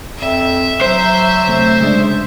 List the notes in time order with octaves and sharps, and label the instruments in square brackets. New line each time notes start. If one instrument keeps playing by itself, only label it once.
[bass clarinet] F2 [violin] E5
[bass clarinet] F#3 [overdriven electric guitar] C5
[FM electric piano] C3 A3
C#3 G#3 D4